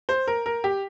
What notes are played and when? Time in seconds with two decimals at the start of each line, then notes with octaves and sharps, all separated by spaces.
0.09 C5
0.28 A#4
0.46 A#4
0.64 G4